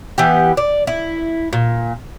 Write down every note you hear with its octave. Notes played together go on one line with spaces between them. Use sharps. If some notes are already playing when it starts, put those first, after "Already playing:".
E3 B3 G4
D5
E4
A#2